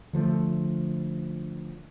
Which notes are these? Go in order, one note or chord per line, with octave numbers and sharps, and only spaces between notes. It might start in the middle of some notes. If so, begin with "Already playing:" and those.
D3 F3 G3 A3